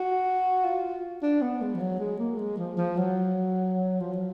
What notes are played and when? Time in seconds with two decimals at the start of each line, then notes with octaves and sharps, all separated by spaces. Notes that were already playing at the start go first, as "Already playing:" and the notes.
Already playing: F#4
0.65 F4
1.22 D4
1.42 B3
1.61 G#3
1.74 F3
1.80 F#3
2.00 G#3
2.19 A#3
2.38 G#3
2.58 F3
2.77 F3
2.97 F#3
4.00 F3
4.13 F#3